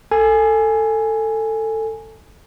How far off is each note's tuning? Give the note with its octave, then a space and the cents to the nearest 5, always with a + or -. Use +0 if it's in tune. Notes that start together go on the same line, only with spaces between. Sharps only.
A4 +15 G#5 +0